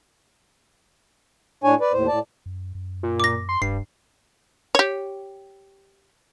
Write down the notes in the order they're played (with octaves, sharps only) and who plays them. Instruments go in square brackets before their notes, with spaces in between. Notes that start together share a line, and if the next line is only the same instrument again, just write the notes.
[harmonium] A2 D4 C#5 G#5
B4 D5
D#2 A2 C5
A2 D5 A5
[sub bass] F#2
F#2
[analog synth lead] A#2
[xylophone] D6 A#6
[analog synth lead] C6
[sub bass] D#1 [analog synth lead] G2 [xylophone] C7
[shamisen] G4 C#5